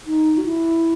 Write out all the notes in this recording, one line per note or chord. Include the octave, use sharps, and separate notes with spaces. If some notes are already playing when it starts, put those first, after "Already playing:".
D#4
F#4
E4